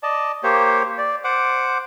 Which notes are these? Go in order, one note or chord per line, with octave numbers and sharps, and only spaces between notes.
D5 D#5 A5
A#3 G4 C5 C#5
D5
C5 F#5 D6